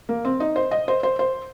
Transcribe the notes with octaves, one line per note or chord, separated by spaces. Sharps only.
A#3
C4
D#4
C5
D#5
C5
C5
C5